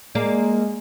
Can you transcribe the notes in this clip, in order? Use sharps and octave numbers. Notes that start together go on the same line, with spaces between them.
G#3 A#3 D5